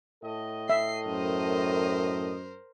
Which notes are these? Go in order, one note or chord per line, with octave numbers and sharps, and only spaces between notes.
A2 A4 D#5
E5 C7
F#2 A#4 C5